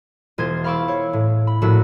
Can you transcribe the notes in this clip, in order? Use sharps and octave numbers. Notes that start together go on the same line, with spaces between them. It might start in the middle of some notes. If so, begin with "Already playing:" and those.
E1 F4 C5 D#5 G#6
F5 B5 C#6 D6 E6
C#5
A2
B5
A#1 A2 F#4 E6